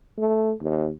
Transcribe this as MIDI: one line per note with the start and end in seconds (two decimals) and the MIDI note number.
0.18 0.52 57
0.61 0.90 39